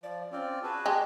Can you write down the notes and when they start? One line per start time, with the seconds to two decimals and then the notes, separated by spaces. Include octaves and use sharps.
0.03 F3 D5
0.32 C4 C#4 F4 D5
0.63 F#4 G#4 B4 A5
0.86 G#3 G4